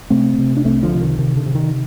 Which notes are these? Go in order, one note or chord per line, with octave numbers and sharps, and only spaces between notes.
C3 A3 C4
C3
D4
C2 A3 C4
D3 F3
C3
D#3
C3 D#3
D3
C3
D#3